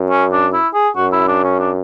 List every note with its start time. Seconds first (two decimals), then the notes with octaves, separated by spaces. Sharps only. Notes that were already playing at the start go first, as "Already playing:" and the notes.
Already playing: F#2
0.10 C#4
0.32 D4
0.53 E4
0.74 G#4
0.96 F#2 F#4
1.12 E4
1.28 D4
1.44 C#4
1.60 D4